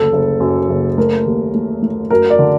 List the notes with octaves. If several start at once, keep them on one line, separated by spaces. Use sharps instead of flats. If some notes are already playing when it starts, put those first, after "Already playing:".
Already playing: F#1 D2 A4
F#1
F#2
F#1
A3 A#4
D#2
A3
A3
F#2 A#4
D5
D3